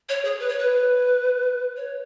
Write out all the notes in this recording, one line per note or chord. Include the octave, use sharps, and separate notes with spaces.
C#5
G#4
B4
C#5
B4
C#5